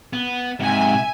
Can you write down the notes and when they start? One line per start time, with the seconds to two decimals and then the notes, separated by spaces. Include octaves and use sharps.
0.13 B3
0.60 G#2 C3 E5 G#5